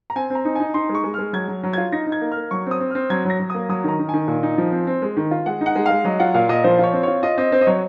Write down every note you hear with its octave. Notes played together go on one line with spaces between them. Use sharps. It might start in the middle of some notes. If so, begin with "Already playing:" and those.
A#5
C4 G#5
C4 A#5
D#4
D#4 G#5
D#4 C6
G#3
C#6
G#3
G#3 F6
F#3 G#6
F#3
F#3
F4 G#6
D#4 A#6
D#4
G#6
A#3
F6
A#3
F#3 C#6
C4
D#6
C4
C4 F6
F#3 G#6
F#3 A#6
F#3
A#3 D#6
F#3 D#6
D#3 A#5
D#3
G#5
D#3
A#2
D#4
F3
C4
C4
G#3
D#3
F4
G#3 F#5
D#4
F#5
G#3
G#3 F5
F#3 D#5
F4 F#5
A#2 F5
A#2 D#5
F3 C5
F4 C#5
C4
F4 C#5
F4 D#5
C4 D#5
C4 C5
D#5
F#3 C#5